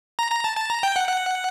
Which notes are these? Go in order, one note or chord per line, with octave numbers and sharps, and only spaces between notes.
A#5
A#5
A5
A5
A#5
G5
F#5
F#5